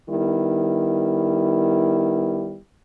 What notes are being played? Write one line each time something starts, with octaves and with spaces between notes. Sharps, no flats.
D#3 G3 B3 E4